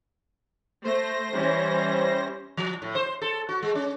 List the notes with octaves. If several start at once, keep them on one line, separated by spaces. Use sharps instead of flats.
A3 C5 A#6
E3 G3 C#4
F3
A2
C5
A4
F#4
G#3
C#4